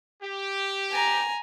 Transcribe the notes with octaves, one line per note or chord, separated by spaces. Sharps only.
G4
G#5 A#5